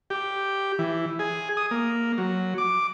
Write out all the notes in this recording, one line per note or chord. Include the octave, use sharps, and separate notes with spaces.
G4
E3
G#4
D#6
A#3
F#3
D6